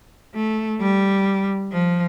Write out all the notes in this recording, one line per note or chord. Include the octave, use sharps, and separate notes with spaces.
A3
G3
F3